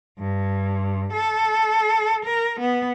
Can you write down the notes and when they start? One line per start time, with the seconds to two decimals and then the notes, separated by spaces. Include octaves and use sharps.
0.19 G2
1.13 A4
2.25 A#4
2.60 B3